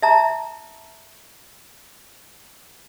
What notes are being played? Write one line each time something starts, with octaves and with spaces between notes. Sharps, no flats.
E5 A5 A#5